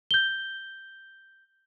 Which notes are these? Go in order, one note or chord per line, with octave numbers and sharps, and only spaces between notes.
G6 G7